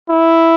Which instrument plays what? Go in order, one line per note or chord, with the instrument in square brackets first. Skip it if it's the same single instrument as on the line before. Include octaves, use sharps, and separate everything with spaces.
[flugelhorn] E4